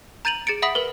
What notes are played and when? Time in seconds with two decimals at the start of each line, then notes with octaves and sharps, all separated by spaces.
0.25 A#5 G6 A6 D#7 F7 F#7
0.47 G#4 A6 C#7 D7
0.62 E5 F#5 B5 D#6 B6 F#7
0.75 A#4 B4